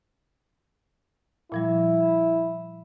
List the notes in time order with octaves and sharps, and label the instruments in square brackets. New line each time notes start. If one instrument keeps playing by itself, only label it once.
[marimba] A#2 F3 G3 [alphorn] E4